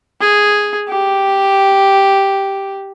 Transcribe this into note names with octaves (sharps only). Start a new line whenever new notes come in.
G#4
G4